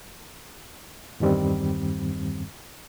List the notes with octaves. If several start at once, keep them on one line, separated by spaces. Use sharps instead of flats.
E2 G2 D#3 G3 C4